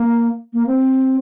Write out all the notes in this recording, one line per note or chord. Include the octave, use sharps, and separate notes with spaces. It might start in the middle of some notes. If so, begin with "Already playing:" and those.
Already playing: A#3
A#3
C4